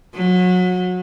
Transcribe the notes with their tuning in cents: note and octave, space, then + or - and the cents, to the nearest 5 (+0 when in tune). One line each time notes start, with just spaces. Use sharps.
F#3 -25